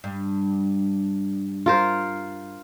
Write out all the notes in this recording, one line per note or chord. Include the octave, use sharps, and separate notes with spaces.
G2
F4 A#4 C5